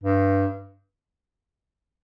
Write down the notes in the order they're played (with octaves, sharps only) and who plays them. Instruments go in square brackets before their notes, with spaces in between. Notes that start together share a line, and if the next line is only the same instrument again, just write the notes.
[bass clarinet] G2